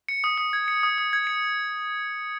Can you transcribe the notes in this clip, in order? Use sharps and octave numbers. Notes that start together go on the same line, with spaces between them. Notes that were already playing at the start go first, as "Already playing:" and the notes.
C#7
D#6
D#6
G#6
C#7
D#6
D#6
G#6
C#7